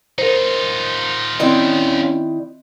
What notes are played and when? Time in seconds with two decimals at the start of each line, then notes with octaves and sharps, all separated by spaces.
0.18 D#4 F4 A#4 C5
1.40 D#3 C4 C#4 E4 D5 D#5